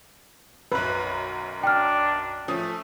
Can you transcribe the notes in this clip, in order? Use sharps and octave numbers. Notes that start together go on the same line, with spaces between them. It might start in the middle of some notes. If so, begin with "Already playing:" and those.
B1 F#2 B4
D4 G5 F6
F3 A3 C#4 D#6